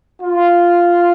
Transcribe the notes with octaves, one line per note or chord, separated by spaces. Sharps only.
F4